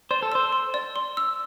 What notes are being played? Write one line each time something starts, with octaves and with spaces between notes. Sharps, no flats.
C5 D5
A4
C5 E6
C6
D5
C6
E6